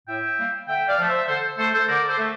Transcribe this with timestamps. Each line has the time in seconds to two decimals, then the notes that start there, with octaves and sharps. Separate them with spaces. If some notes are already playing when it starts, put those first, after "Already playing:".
0.08 A2 E5 G5
0.37 G3 A#3
0.68 D3 E5 G5
0.88 D5 F5
0.99 F3 A3
1.08 C5 E5
1.28 D3 A4 C5
1.58 A3 A4 C5
1.73 A4 C5
1.88 D3 A#4 D5
2.09 A4 C5
2.19 A3